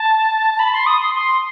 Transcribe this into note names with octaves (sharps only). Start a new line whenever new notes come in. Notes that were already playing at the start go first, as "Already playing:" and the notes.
Already playing: A5
A5
B5
C6
D#6
C6
C6